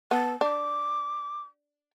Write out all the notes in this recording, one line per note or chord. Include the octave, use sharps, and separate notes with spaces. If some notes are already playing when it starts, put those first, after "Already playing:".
B3 A5
D4 D6